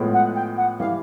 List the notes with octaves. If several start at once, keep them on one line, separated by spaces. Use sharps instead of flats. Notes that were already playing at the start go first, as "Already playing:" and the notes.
Already playing: A2 F3 G#3 B3
F#5
G5
F#5
E3 G3 F5